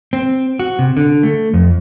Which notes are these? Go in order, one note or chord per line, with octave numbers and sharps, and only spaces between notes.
C4
F#4
C3
D3
A3
F2